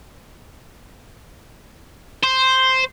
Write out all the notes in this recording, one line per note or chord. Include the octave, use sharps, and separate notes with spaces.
C5